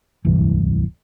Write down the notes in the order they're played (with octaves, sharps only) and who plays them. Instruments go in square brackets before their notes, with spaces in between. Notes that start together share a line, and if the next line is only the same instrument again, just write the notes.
[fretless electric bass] D1 C2 G2 E3